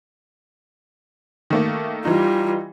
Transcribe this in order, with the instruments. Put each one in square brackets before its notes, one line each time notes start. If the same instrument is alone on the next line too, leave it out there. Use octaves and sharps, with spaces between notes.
[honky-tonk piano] D#3 A3 A#3
[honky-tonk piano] E3 D#4 [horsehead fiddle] G3 F4